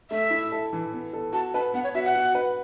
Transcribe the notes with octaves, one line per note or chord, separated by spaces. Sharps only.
A3 E5
E4
A4
E3
B3
A4
F#4 A5
B4 A5
B3 F#5
C#5
F#4 E5
F#5
F#4
B4